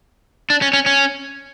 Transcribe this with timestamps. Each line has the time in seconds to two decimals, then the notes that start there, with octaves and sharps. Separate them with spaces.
0.50 D4
0.62 C#4
0.73 C#4
0.86 C#4